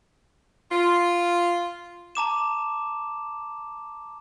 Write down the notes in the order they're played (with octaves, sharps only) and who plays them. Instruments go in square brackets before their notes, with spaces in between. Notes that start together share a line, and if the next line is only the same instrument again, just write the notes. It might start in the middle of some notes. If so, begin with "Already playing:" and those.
[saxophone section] F4
[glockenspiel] A5 A#5 D6 E7